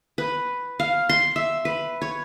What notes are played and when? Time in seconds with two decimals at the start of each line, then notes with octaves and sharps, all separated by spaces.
0.18 B4
0.80 F5
1.09 C6
1.36 E5
1.65 B4
2.02 C#5